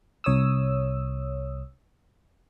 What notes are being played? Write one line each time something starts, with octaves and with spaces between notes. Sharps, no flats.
C2 C#5 D#6 E6